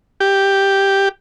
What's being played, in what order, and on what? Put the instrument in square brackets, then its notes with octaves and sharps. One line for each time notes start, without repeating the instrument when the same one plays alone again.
[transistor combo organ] G4